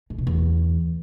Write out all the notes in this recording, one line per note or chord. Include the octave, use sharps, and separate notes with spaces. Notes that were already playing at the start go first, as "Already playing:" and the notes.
A2
B2
E2